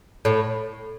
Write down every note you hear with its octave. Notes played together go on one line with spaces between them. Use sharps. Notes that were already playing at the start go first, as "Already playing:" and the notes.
A2